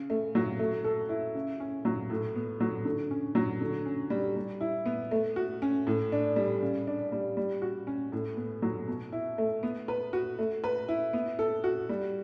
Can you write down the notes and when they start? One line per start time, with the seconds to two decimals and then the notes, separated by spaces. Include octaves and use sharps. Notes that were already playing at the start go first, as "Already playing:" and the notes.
Already playing: C#3
0.10 A3
0.35 F#3
0.59 A3
0.84 A4
1.09 E4
1.35 C#3
1.60 C#4
1.85 F#3
2.10 A2
2.36 B3
2.60 F#3
2.85 D3
3.11 C#4
3.35 F#3
3.61 D3
3.85 C#4
4.10 G3
4.36 G3
4.61 E4
4.86 B3
5.11 A3
5.36 F#4
5.62 C#4
5.87 A2
6.12 D4
6.36 G3
6.62 C#3
6.87 D4
7.12 G3
7.37 G3
7.62 F#4
7.87 C#4
8.12 A2
8.37 B3
8.62 F#3
8.88 B2
9.12 E4
9.38 A3
9.63 B3
9.88 B4
10.13 F#4
10.39 A3
10.64 B4
10.88 E4
11.13 B3
11.39 A4
11.64 F#4
11.89 G3